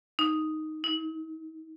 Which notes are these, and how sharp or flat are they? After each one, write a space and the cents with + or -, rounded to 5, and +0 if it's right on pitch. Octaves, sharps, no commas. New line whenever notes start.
D#4 +0
D#4 +45